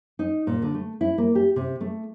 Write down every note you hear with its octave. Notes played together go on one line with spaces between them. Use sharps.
D#4
A#2
D3
A3
E4
A#3
G4
C3
A3